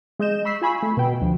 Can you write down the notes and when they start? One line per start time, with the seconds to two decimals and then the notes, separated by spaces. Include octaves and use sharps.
0.19 G#3 D#5 G6 E7
0.45 B5 C#6 E6 B6 C7
0.62 F4 G#5 B5 C#6 E6
0.82 A3
0.97 B2 G5
1.21 D2 F3